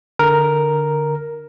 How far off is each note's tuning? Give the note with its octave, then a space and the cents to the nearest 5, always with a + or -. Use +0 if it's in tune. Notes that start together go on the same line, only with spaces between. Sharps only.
D3 +0 A#4 +0